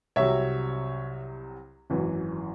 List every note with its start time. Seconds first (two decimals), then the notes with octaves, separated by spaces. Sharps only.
0.16 C2 C3 F#3 C#5 E5
1.90 G#1 F#2 E3